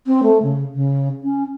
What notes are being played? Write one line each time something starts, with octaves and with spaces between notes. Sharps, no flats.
C4
A3
C#3
C#3
C#4